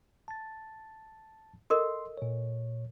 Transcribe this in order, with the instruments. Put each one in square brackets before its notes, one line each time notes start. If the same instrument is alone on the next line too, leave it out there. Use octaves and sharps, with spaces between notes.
[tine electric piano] A5 A6
[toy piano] A4 A#4 D#5 [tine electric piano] C6
[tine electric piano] A#2 C#5